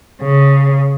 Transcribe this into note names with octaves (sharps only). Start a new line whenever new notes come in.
C#3